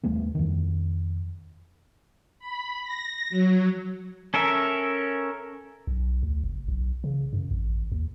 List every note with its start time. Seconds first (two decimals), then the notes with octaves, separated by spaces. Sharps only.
0.03 D#2 G3 A3 B3
0.35 F2 D#3
2.39 B5
2.83 A#6
3.30 F#3
4.34 C#4 A4 A#4 E5
5.87 B1
6.23 D2
6.44 F#1
6.68 B1
7.04 C#3
7.33 F#2
7.51 A1
7.92 D#2